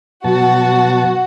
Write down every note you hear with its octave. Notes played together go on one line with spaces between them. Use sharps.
B2 F#3 F#4 A5